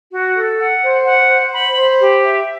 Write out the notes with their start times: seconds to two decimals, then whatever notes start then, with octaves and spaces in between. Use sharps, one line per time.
0.12 F#4
0.35 A4
0.59 F#5
0.83 C5
1.06 F#5
1.29 C5
1.52 B5
1.76 C5
2.00 G4
2.24 E5